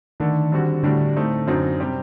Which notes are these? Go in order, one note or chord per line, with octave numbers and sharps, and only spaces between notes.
D3 D#3 A3 D4
D3 G3 C4 F#4
A2 D3 G3 D4 F#4
A2 A3 C4 D#4
F#2 D3 F#3 C4 D#4
C3 G3 C4 G4